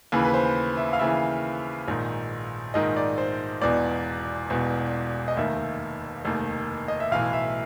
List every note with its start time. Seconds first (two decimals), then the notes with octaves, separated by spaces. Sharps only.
0.12 D#2 C#3 E3 B4
0.25 B4
0.34 C5
0.77 E5
0.93 F5
0.99 D#2 C#3 E3 E5
1.88 A#1 G#2 D#3
2.74 A#1 G#2 D#3 D#5
2.97 D5
3.18 C5
3.62 E1 E2 B2 D5
4.50 E1 E2 B2
5.28 D#5
5.37 F1 D#2 D#3 E5
6.25 F1 D#2 D#3
6.88 D#5
7.00 E5
7.12 B1 A2 E3 F5
7.33 E5